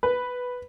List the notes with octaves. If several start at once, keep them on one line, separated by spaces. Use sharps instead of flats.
B4